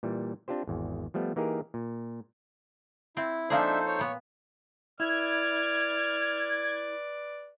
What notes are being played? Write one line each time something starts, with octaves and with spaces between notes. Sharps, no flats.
A#2 E3 G3
C4 D4 F4 G4 C5
G#1 E2
F3 G3 A3 B3
E3 A#3 D#4 G4 G#4 A#4
A#2
C4 E4
F3 A#3 D4 D#4 G#4 A4 C5 E5
C#5
A#2 B3
E4 B4 D5 F6 G#6